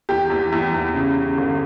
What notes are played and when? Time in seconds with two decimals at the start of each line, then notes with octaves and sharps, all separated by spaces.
0.09 E2 G4
0.30 E2
0.52 E2
0.74 E2
0.95 C#3
1.17 C#3
1.38 G1